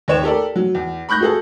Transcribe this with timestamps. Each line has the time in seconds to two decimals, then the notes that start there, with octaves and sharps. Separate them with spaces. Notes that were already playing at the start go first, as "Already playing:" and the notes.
0.08 D#2 C#5 E7
0.24 G4 A4 A#4 D5
0.56 F#3
0.75 E2
1.09 B5 C#6 F#6 G6 A#6
1.21 F#4 G#4 A4